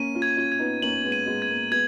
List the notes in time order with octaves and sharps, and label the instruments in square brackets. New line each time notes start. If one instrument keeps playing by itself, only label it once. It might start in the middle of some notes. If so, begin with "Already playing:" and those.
Already playing: [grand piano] A#3 C#4 [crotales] D#7
[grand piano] C#4 F4
[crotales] G#6
[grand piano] C#4 F4
[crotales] G#6
[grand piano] B3 D#4
[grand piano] A#3 C#4 [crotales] F#7
[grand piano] A#3
G#3 B3
[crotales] D#7
[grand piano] G#3 B3
[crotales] G#6
[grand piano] A#3
[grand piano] G#3 B3 [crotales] G#6